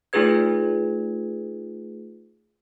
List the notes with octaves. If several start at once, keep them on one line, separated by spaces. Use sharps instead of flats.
A3 D#4 F4 G#4 B4 G#6